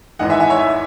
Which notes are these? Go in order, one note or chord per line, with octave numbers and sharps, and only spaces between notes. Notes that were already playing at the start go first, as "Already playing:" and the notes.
G#1 G#2 E3 D#5 F#5
E5 G#5
E5 G#5
C#5 E5